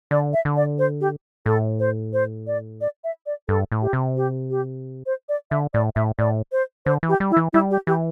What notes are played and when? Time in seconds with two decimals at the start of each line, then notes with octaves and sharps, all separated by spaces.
0.11 D3 D5
0.33 E5
0.45 D3
0.57 D5
0.79 C5
1.01 G4
1.46 A2 A4
1.80 C5
2.13 C5
2.47 D5
2.81 D5
3.04 E5
3.26 D5
3.48 G2 A4
3.72 A2
3.82 G4
3.93 C3
4.17 G4
4.50 G4
5.06 C5
5.29 D5
5.51 D3 E5
5.74 A2 D5
5.96 A2 E5
6.19 A2 D5
6.52 C5
6.86 D3 C5
7.03 E3
7.09 G4
7.20 G3
7.31 E4
7.37 E3
7.53 G3 E4
7.71 G4
7.87 E3 G4